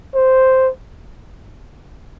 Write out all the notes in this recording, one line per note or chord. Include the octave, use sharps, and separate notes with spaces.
C5